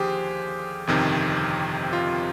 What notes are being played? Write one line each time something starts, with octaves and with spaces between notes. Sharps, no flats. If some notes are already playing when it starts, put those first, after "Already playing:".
Already playing: D#2 D3 F3 G4 G#4 C5
G1 F2 C3 D#3
F4